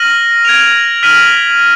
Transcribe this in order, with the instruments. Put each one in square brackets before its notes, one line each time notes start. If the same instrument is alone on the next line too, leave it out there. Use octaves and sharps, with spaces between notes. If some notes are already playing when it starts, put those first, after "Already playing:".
Already playing: [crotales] F6 A#6 D#7 F#7
G#6 D7 F7
F6 B6 D#7 F#7